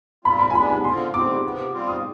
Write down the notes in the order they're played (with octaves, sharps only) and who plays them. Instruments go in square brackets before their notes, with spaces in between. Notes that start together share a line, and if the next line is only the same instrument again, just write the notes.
[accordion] C3 G3 C4 F4 [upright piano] B5
[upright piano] B5
G#5
[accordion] C3 G3 B3 D4 [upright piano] B5
[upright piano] G#5
[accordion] D3 F3 C4 F4 [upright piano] C6
[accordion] D3 G3 C4 [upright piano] D6
[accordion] C3 F3 B3
G3 C4 F4
[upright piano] D#6